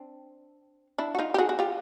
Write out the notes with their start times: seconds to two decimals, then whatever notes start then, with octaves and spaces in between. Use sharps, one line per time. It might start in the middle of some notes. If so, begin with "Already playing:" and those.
Already playing: C4 D4
0.98 D4 E4
1.15 F#4
1.18 D#4 F4
1.34 G4
1.38 F#4 G#4
1.49 F#4
1.59 F4 G4